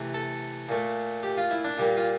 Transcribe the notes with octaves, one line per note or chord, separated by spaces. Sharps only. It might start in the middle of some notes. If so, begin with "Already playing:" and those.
Already playing: C3 E3 A3
A4
A#2 A3
G4
F4
E4
D4
A#2 G3 A#3
F4